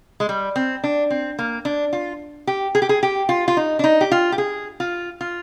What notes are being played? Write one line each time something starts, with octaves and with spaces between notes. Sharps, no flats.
G#3
G3
C4
D4
C4
A#3
D4
F4
G4
G#4
G4
G#4
G4
F4
F4
D#4
D4
D#4
G4
F4
G4
G#4
F4
F4